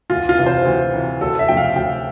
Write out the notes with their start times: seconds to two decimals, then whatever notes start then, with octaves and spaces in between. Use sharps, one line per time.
0.10 D2 F4
0.29 F4
0.38 C3 E3
0.46 C5
0.65 D2
0.94 C3 E3
1.20 D2 A4
1.39 E5
1.48 C3 F3 A3 G5
1.57 F5
1.76 D2 G5